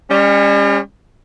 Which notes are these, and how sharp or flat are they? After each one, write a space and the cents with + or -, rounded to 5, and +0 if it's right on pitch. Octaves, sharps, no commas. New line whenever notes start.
G3 +45 C#4 +0